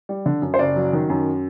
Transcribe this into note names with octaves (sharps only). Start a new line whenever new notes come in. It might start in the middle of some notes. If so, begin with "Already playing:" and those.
G3
D3
F#2
C5
F#1 D5
F#3
D#3
F#2